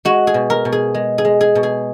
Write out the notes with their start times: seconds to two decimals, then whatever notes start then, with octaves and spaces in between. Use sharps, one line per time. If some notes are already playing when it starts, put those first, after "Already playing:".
0.05 G#3 F#4
0.27 G#4
0.34 B2
0.50 A#4
0.65 B2
0.72 G#4
0.94 G#3
1.18 G#4
1.25 G#3
1.41 G#4
1.55 B2
1.63 G#4